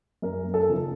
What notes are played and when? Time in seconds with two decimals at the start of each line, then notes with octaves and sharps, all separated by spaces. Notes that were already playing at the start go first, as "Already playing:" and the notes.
0.22 F#2 A#4
0.54 A4
0.68 C#3 F3 A#3 D#4